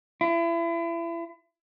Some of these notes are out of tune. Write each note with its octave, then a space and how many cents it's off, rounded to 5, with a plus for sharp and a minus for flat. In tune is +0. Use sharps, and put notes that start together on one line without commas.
E4 +35